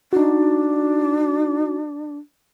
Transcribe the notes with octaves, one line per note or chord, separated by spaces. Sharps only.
D4 D#4 F#4